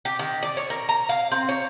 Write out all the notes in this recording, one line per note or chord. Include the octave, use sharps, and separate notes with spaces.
G4
D#3
D5
C#5
A#4
A#5
F5
C4
C#5